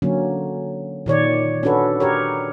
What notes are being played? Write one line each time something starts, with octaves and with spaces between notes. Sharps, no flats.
D3 F#3 A#3 C#4
A#2 D#3 C#5 D5
C#4 D4 F#4 A4 B4
G4 A#4 C#5